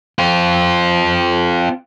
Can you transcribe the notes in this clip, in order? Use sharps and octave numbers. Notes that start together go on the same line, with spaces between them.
C4 F4